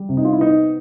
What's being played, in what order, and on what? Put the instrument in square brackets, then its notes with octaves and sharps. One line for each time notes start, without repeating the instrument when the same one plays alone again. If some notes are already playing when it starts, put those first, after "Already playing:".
Already playing: [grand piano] G3
C3
D#4
F4
E4
B3 D#4